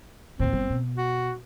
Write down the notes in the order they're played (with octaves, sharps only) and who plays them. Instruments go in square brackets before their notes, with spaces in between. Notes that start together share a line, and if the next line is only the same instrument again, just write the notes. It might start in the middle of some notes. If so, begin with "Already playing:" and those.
[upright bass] D#2 A2 [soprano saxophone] C4
[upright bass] G1
B2
[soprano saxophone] F#4